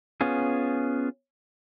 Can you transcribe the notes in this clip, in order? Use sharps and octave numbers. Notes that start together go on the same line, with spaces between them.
B3 C#4 F4 G#4